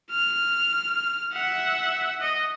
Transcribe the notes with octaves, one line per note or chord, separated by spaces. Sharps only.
F6
E5 F#5
D#5